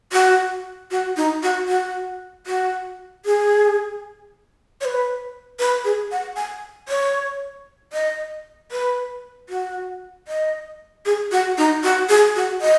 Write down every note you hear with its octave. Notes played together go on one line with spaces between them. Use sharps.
F#4
F#4
D#4
F#4
F#4
F#4
G#4
C#5
B4
B4
G#4
F#5
G#5
C#5
D#5
B4
F#4
D#5
G#4
F#4
D#4
F#4
G#4
F#4
D#5